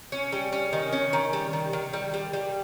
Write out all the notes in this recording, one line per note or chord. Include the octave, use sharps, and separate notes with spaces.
C#4
G3
C#4
D#3
C#4
D#3
G3
D#3
D#3
G3
G3
G3